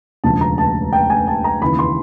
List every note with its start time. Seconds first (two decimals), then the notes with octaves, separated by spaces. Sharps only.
0.24 E1 D2 C#3 F3 A5
0.41 A#5
0.58 A5
0.93 G5
1.10 G#5
1.27 A5
1.44 A#5
1.62 D#2 C#3 E3 B5
1.79 C6